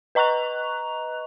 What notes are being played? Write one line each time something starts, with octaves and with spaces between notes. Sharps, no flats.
B4 D#5 A#5 C#6 F#6 F7